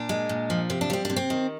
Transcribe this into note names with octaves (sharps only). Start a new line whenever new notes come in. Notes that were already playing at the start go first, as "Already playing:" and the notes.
Already playing: A#2 D4
G#3
A#2
F3
C3 C4
D4
G3 C4
C3 D4
C4
D#3